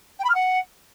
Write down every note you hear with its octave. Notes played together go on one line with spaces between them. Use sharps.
G5
B5
F6
F#5